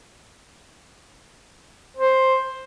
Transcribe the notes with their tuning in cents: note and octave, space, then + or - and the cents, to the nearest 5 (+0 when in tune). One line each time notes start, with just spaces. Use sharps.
C5 +5